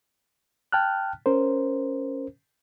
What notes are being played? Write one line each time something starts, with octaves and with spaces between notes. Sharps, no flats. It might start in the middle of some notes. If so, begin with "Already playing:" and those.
G5 A5 F6 F#6
C#4 A#4 C5